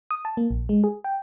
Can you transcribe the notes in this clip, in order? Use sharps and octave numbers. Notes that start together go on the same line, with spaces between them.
D#6
A5
A#3
A#1
G#3
G#4
G5